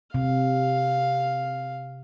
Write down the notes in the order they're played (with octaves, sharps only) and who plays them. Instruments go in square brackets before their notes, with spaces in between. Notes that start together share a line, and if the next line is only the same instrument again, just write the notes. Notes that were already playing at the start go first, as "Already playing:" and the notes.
[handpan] C3 [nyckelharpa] F5